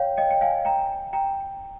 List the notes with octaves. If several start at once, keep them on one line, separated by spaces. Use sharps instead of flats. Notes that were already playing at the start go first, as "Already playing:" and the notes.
Already playing: C#5 F5 G5
D#5 G5
G5
F5 G#5
G5 A#5
G5 A#5